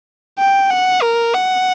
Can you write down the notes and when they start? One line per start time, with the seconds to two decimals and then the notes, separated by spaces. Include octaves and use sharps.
0.39 G5
0.70 F#5
1.02 A#4
1.34 F#5